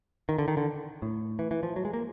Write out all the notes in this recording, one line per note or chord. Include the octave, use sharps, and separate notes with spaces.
D#3
D3
D#3
D3
A2
E3
E3
F3
F#3
G#3
A#3